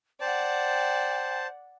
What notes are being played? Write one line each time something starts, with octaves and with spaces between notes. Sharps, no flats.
C5 D5 F#5 G5 A5